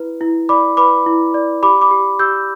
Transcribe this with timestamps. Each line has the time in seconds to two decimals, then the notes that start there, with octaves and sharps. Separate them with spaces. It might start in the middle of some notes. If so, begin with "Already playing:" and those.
Already playing: E4 B4
0.21 E4
0.49 D5 B5 D6
0.77 B4 B5 D6
1.06 E4
1.34 D5
1.63 G4 B5 D6
1.82 B5 D6
1.91 G4
2.19 G4 E6 G6